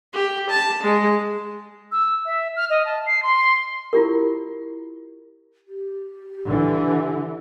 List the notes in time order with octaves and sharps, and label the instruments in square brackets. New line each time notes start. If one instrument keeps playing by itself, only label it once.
[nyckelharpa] G4
A5
G#3
[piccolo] E6
E5
F6
D#5
A5
C7
C6
[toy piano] E4 F4 G4 A#4
[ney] G4
[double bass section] D3 E3